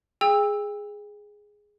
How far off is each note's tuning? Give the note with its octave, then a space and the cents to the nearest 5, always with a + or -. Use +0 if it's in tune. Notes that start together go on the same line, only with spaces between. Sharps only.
G#4 +0 G5 +35 E6 -5